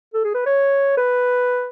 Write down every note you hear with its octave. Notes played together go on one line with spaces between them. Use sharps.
A4
G#4
B4
C#5
B4